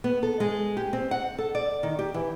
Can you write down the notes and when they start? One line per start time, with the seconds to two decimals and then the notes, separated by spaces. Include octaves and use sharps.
0.04 B3
0.23 A4
0.40 G#3
0.77 G4
0.93 C4
1.11 F#5
1.38 A4
1.55 D5
1.83 D#3
1.99 G4
2.14 E3